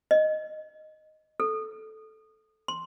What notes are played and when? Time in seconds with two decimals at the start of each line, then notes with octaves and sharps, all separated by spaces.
0.11 D#5
1.40 A4
2.68 C6